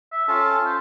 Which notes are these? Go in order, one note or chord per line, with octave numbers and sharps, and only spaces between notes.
E5
C#4 F4 A4 A5
C5